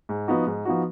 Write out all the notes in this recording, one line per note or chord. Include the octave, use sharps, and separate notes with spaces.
G#2
F3 B3 D#4 F#4
G#2
F3 B3 D#4 F#4